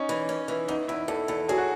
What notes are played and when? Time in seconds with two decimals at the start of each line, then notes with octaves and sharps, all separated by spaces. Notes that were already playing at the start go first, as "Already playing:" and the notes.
Already playing: C#4 D#4
0.09 E3
0.29 C#4
0.48 E3
0.68 E2 D#4
0.88 E2 E4
1.08 E2 A4
1.28 E2 A4
1.49 F#3 G#4
1.58 F#4